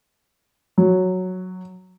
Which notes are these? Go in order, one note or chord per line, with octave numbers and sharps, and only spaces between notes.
F#3